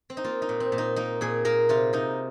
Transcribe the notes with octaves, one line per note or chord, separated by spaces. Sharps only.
C4
D#4
A#3 F4
D#4
A#2
C4
A#2
D#4
A#3 D#4
A#2 G#4
A#3 A#4
C3 F4
C3 D#4